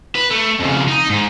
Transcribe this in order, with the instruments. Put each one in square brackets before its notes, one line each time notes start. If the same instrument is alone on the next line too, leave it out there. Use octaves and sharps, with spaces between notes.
[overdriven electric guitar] B4
A3
F2 C#3
D#4
G#2